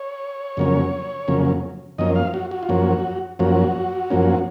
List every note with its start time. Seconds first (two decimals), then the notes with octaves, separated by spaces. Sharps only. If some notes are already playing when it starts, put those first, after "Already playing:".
Already playing: C#5
0.57 F2 C#3 F#3 A#3 C#4
1.28 F2 C#3 F#3 A#3 C#4
1.98 F#2 F3 A#3 C#4 D#5
2.16 F5
2.34 F#4
2.51 F#4
2.63 F4
2.69 F#2 F3 A#3 C#4 F#4
3.39 F#2 F3 A#3 C#4 F#4
4.10 F#2 F3 A#3 C#4